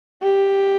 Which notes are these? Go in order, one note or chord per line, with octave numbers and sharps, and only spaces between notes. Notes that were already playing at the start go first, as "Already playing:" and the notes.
G4